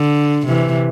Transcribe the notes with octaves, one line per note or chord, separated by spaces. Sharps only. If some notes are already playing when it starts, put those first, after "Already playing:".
Already playing: D3
C3 E3